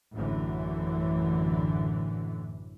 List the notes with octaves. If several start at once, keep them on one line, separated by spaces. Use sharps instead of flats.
A1 F#2 A2 D3 E3